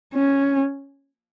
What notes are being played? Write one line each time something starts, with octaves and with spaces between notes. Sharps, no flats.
C#4